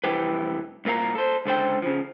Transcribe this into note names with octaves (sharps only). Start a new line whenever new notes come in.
C2 F2 E3 G4 B4
C2 A#2 A#4 F5 A#5
A4 C5
C#2 D3 C5 G5
C#3 F3